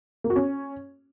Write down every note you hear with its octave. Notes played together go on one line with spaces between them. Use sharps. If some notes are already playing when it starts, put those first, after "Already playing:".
A#3
F#4
C#4